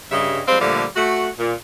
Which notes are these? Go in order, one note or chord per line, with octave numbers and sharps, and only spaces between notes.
G2 C#3 G3 D#5 E5
F3 G3 G#3 C4 F5
A#2 D3 F3 G3 A3
A3 F#4
A#2